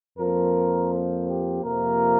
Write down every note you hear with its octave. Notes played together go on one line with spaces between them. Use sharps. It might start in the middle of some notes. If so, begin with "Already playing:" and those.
F2 F3 A#3 A#4
C5
G4
F2 C3 F3 A#3 A#4